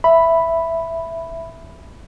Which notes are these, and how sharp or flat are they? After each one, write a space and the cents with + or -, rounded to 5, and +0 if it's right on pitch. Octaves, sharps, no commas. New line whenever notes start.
E5 +5 B5 +0